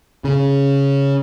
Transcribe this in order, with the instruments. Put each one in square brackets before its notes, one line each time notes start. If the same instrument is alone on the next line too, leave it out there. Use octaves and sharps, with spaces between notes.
[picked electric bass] C#3